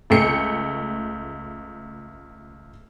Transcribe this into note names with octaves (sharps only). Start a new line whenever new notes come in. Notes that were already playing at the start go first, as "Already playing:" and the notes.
C#2 A3 G5 C#7